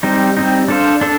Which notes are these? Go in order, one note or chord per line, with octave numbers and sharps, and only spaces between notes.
G3 C4 D#4
G3 C4 D#4
D4 A4 C5 F5
D4 A4